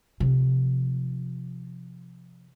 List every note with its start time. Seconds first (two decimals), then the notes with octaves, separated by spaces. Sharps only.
0.20 C3 F3